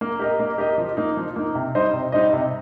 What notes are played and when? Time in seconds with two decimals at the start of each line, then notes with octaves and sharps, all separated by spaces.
0.01 A#3
0.19 G4 A#4 D#5
0.39 A#3
0.58 G4 A#4 D#5
0.78 F3
0.97 A#3 D#4
1.17 F3
1.36 A#3 D#4
1.55 C3
1.75 G3 D#4 C5 D#5
1.93 C3
2.12 G3 D#4 C5 D#5
2.33 C3